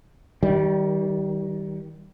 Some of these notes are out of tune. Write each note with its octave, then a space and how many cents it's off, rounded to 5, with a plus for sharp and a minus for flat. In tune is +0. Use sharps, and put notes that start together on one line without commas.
D#3 +25 G3 -20